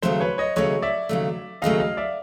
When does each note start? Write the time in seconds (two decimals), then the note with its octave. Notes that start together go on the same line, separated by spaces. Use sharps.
0.02 D#2 C#3 F#3 A3 C5
0.20 B4 C#5
0.38 C#5 D#5
0.56 D#2 C#3 F#3 A3 C#5 D#5
0.82 D5 E5
1.09 D#2 C#3 F#3 A3
1.62 D#2 C#3 F#3 A3 D#5 F5
1.80 D#5 F5
1.97 D5 E5